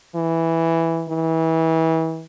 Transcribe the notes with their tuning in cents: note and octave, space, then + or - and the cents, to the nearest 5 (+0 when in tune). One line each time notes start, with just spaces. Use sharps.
E3 +0
E3 -30